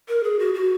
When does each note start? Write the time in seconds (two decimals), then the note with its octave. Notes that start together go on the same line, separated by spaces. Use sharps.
0.08 A#4
0.23 G#4
0.39 F#4
0.54 F#4